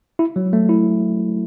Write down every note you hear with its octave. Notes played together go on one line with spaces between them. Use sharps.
E4
F#3
A3
E4